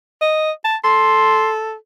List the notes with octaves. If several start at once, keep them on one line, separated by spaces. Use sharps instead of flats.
D#5
A5
A4 C6